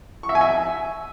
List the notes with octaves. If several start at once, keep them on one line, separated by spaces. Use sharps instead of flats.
C#6
E5
G#5
E5